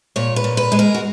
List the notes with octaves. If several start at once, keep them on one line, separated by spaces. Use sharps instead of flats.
A#2 C#5
B4
A#2
B4
G#3
A#4
F#4